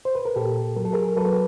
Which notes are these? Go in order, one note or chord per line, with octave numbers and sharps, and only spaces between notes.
C5
B4
A#4
A#2 G4 A4
F#3 A#4
A4
G#4 A#4
F#3 A4 B4